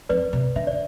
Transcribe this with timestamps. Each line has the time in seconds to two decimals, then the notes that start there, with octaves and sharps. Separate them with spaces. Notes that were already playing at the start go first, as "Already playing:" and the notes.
0.09 F2 B4 D5
0.33 C3
0.56 D3 E5
0.67 D5